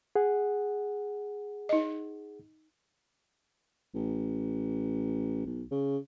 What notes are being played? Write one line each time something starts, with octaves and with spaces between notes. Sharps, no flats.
G#4 F#5
D#4 D#5
A1
B1
C#3